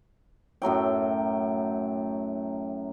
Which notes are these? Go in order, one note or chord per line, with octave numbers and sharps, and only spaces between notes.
F#2 A2 F#3 G5